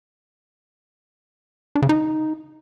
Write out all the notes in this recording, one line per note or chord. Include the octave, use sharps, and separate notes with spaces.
D4
C#3
D#4